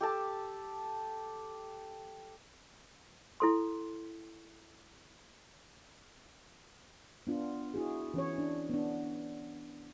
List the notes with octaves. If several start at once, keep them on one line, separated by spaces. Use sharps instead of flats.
G4 A4 A5
E4 A4 C6
B3 D4 F4
E4 F#4 G#4
E3 C#4 C#5
D4
B3 D4